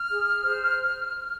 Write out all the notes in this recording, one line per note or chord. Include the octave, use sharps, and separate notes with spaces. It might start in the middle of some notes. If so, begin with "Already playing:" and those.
Already playing: F6
G#4
C5